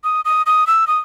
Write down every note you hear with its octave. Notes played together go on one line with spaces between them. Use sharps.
D#6
D#6
D#6
E6
D#6